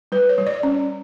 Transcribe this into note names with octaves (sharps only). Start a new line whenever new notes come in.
G3 B4
C#5
G3
D5
C#4